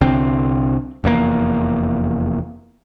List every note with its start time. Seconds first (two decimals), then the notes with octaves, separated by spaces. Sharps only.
0.01 C2 D3 C4
1.04 F1 E2 B2 A#3